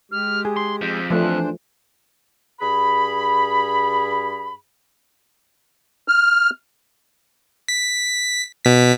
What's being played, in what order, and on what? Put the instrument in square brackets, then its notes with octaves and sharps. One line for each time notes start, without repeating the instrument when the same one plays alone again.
[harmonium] G#3 G4 [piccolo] F6
[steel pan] G#4
[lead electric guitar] C6 [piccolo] C7
[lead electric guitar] F2 [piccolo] G6
[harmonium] E3 D4 C5 [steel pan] F3 A3 [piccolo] F#6
[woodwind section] G2 G#4 B5
[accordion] F6
[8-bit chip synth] B6
B2 B6